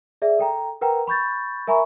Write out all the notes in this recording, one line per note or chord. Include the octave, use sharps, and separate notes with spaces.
G#4 D5 E5
A4 G5 A#5
A#4 B4 F#5 G5 A#5
B5 C#6 G6 A6
A#4 E5 G#5 A#5 B5 C#6